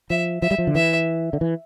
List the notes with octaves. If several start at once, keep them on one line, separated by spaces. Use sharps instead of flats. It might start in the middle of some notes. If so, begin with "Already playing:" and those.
F3 E5
F3 E5
G3
F3
D3
E3 E5
D3
E3